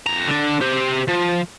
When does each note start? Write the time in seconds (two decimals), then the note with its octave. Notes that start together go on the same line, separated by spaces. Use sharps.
0.06 F2 A#5
0.27 D3 D4
0.61 G4 C5
1.08 F3